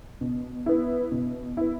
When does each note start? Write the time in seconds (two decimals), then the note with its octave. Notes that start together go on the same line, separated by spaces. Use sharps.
0.21 B2
0.66 B3 E4
1.11 B2
1.57 B3 E4